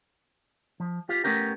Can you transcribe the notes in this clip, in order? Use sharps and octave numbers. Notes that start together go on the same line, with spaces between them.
F3
F4 G4
A3 B3 C#4 G4 A#4